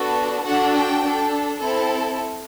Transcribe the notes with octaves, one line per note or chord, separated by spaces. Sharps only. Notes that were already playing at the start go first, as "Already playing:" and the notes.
Already playing: B3 D4 F#4 A4
D4 F#4 A4 F#5
G5
D4 A4
C4 E4 A4